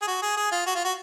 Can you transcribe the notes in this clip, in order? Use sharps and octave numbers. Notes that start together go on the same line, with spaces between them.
G#4
F#4
G#4
G#4
F4
F#4
F4
F#4